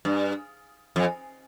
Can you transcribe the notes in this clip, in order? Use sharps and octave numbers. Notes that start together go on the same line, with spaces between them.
G2
F2